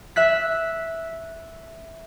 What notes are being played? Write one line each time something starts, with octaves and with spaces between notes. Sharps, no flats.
E5 F#6 B6